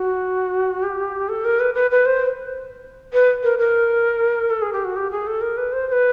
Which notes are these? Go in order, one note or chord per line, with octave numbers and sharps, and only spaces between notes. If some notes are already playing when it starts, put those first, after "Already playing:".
Already playing: F#4
G4
A4
A#4
B4
B4
B4
C5
B4
A#4
A#4
A4
G#4
G4
F#4
G4
G#4
A4
A#4
B4
C5
C5
B4